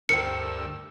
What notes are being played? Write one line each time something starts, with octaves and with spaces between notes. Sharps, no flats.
D2 G2 A#4 C5 G5 E6 C#7